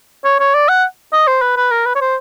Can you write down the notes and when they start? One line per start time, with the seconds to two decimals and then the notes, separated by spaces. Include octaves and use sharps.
0.25 C#5
0.40 C#5
0.54 D5
0.69 F#5
1.13 D#5
1.27 C5
1.42 B4
1.57 B4
1.71 A#4
1.86 B4
1.95 C#5
2.01 C5